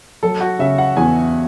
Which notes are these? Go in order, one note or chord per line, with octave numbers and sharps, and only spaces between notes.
F#3 A4
F#4
C#3 E5
F#5
E2 G#5